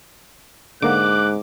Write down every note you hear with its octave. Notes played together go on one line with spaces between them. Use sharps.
G#2 D3 A#3 F#5 D6 F#6